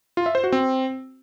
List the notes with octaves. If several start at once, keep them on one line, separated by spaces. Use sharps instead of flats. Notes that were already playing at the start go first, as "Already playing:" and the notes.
F4
E5
C5
F#4
C4